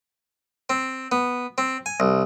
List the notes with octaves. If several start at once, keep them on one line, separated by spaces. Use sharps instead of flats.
C4
B3
C4
G#5
C2